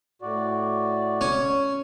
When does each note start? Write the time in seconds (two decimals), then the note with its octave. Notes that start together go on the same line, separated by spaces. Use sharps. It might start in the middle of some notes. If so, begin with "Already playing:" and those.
0.22 A2 F#4 D5
1.21 C#4